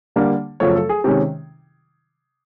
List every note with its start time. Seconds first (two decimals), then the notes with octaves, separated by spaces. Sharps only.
0.16 D3 G3 A#3 D4
0.60 F#2 C#3 F3 A3 C#5
0.75 A4
0.89 G#4
1.04 C3 D#3 G#3 C#4 G4